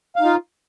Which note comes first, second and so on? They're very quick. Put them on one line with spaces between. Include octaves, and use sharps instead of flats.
F5 D#4 F4